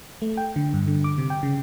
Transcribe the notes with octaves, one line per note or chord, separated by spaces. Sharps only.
A3
G5
D3
G2
D3
D6
C3
G5
C#3